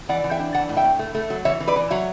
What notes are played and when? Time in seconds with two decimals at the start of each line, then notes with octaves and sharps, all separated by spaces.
0.09 E3 D5 F#5
0.24 E3
0.31 E5 G5
0.39 D4
0.54 E3 F#5 A5
0.69 A2
0.77 E5 G5
0.84 A2
0.99 A3
1.15 A3
1.30 F#3
1.45 E3 C#5 E5
1.60 E3
1.67 B4 D5
1.76 E3
1.91 F#3 C#5 E5